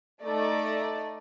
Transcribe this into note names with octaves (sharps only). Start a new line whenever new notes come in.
A3 D#4 D5